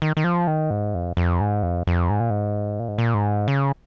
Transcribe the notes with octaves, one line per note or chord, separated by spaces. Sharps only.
D#3
D#3
F3
D#3
G#2
F2
F2
G#2
F2
F2
G#2
A#2
G#2
A#2
G#2
A#2
G#2
C#3